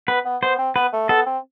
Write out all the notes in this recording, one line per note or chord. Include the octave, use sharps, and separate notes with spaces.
B3 B4
B3
B3 C5
C4
B3 B4
A3
B3 A4
C4